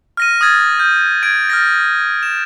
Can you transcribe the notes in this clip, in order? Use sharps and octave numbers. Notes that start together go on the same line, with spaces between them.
F6 A#6 D#7
D#6 F6 G#6 A6
F6 G6
G#6 D7
F6 A6 A#6
E7